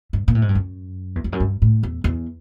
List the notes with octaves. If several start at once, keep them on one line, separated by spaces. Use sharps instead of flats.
G2
A#2
A2
G#2
G2
F#2
E2
F2
F#2
G2
A2
E2
E2